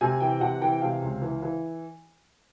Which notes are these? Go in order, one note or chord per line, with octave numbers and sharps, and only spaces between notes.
C3 G#5
E3 G5
C3 F#5
E3 G5
C3 F5
C#2
E3
E3